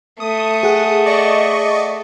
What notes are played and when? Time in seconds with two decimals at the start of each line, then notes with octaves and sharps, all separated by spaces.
0.20 A3 D#6
0.63 G#4 F#5
1.06 D5 D#5 C#6